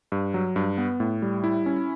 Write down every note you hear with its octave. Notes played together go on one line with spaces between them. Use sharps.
G2
F#3
G2
B3
A2
G3
E4
C#4